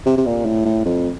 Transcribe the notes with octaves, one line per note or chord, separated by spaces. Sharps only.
C3
C3
A#2
A2
A2
F2